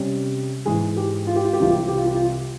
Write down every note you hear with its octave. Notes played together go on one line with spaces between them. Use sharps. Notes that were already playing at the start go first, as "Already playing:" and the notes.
Already playing: C3 G3 C#4
G#2 E3 G#3 G#4
G4
F4
G4
F4
G4
C2 C3 E3 F4
G4
F4
G4
F4
G4
F4